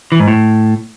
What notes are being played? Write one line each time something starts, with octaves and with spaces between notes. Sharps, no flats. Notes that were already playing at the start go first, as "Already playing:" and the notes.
E3
G#2
A2